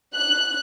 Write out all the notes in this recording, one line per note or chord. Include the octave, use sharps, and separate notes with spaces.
F#6